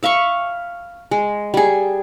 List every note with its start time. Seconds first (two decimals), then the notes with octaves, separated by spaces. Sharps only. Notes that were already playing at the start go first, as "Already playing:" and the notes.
0.03 E5 F5 B5 C#6
1.11 G#3
1.54 G3 G#4